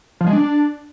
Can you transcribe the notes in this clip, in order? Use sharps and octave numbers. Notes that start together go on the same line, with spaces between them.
F3
G#3
D4